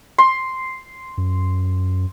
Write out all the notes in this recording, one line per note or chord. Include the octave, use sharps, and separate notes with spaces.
C6
F#2